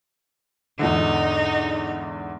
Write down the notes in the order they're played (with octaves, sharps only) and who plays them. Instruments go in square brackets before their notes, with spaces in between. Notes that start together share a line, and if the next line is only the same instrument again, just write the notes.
[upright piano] E2 G#2 D3 [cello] D#4